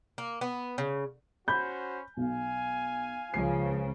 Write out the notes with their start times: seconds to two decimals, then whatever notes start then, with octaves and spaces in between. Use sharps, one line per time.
0.18 A#3
0.41 B3
0.78 C#3
1.48 C#4 F#4 C5 B5 G6
2.17 B1 F5 G#5
3.34 C#2 C#3 F3 C7